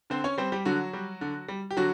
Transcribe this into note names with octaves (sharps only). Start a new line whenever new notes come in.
D3 C4 C5
C#4 C#5
G3 C4 C5
G3 G4
D3 F#3 F#4
G3
D3
G3
G4
D3 F#3 F#4